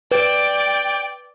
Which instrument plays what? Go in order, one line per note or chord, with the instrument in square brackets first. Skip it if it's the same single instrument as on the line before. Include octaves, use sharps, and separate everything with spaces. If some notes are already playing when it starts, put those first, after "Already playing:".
[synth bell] B4 [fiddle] D5 [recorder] G5